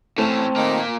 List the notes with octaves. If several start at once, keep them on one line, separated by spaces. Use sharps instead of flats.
A2 A3 C4 C#4 A5 E7
D#3 A#3 D5